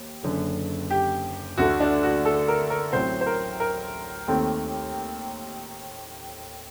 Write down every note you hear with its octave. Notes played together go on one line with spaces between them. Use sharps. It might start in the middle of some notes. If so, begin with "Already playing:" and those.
Already playing: D#2
F#1 F#2 D3
G4
D2 D3 A3 F#4
D4
F#4
A4
A#4
A#4
A1 A2 F#3 C4 C5
C5
A#4
A#4
D#2 D#3 A3 C4